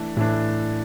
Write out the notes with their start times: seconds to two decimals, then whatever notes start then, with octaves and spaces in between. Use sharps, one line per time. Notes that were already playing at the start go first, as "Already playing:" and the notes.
Already playing: E3 A3 D4
0.17 A2 E3 A3 D4